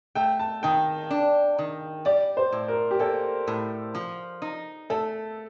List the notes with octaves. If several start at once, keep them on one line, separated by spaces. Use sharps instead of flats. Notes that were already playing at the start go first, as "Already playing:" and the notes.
A3 G5
A5
D#3 G5
D4
D#3
G3 D5
C5
A2
A#4
G4
A#3 A4
A2
F3
D#4
A3 A4